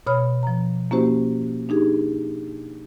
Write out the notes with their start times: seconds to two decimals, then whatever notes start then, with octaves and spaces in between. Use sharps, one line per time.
0.07 B2 C#5 B5 F6
0.43 F3 A#5
0.91 A#3 C#4 E4 F#4 G4 C5
1.69 D4 D#4 G4 G#4